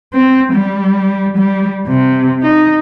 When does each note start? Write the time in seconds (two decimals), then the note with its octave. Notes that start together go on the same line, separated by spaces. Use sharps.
0.13 C4
0.53 G3
1.37 G3
1.87 C3
2.42 D#4